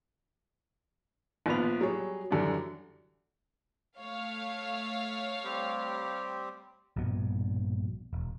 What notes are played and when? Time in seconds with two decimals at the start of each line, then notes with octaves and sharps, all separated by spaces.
1.46 A#1 F3 B3 B4 F7
1.81 F#3 G3 G#4 C#5
2.31 F#2 D3 E3 G3 D4
3.97 A3 C#5 F5
5.44 G3 C4 G4
6.96 A#1 G2 B2
8.13 E1